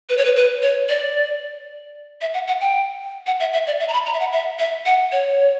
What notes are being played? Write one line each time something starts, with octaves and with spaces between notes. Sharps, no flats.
B4
C#5
B4
B4
C#5
D5
E5
F#5
F#5
G5
F#5
E5
E5
D5
E5
A#5
B5
A#5
E5
F#5
E5
E5
F#5
C#5